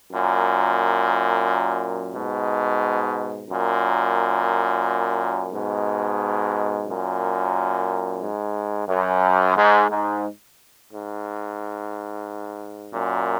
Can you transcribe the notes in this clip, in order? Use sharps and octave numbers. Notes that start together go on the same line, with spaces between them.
F#2 A#2
G#2 B2
F#2 A#2
G#2 B2
F#2 A#2
G#2
F#2
G#2
G#2
G#2
F#2 A#2